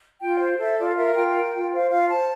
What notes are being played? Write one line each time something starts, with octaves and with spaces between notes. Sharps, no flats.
F4 G5
C5
A4 E5
F4 D5
F5
A#4 E5
F4 G5
A#4
F4
C5 F5
F4 F5
C5 A5